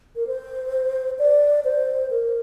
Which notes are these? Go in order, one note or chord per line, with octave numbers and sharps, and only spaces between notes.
A#4
C5
D5
C5
A#4